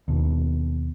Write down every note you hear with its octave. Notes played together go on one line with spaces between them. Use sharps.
D#2 B2